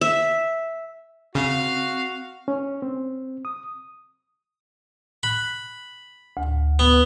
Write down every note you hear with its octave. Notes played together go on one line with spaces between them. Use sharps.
E5
C#3 C4 F#4 F5
C#4
C4
D#6
B5 F#6
D2
B3